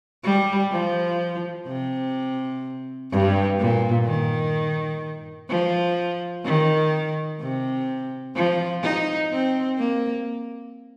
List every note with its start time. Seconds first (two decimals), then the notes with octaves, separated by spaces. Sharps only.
0.23 G3
0.71 F3
1.67 C3
3.11 G2
3.59 A#2
4.05 D#3
5.49 F3
6.44 D#3
7.41 C3
8.35 F3
8.83 D#4
9.31 C4
9.78 A#3